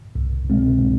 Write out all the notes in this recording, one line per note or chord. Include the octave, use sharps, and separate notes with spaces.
C2
B2 G#3 C4